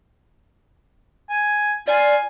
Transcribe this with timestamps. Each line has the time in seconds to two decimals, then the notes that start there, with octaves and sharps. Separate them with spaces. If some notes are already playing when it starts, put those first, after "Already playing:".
1.30 G#5
1.88 F4 D5 G#5